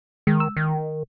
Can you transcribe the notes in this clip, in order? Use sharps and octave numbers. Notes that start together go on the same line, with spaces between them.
D#3 G#3
E6
D#3